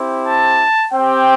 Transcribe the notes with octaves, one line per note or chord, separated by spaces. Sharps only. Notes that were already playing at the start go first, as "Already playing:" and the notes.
Already playing: C4 E4 G4
A5
C4 G4 G5